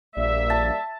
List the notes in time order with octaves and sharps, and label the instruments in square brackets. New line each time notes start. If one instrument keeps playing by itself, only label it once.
[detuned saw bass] A#1 [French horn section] G3 A#3 D5 [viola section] E5
[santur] A5